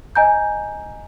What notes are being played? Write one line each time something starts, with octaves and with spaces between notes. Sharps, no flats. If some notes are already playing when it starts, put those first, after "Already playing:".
D#5 G#5 A#5 G6